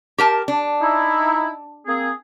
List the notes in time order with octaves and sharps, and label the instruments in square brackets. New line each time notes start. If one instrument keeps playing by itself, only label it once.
[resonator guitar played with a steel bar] G4 A#4 A5
D4
[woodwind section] D#4 E4
A#3 C4 G#4